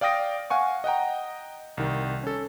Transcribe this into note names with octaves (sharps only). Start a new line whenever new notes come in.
D5 F5 G5 D#6 A#6 D7
F5 F#5 G#5 C#6
D#5 F#5 G5 A#5
C2 D#3
C#4 A4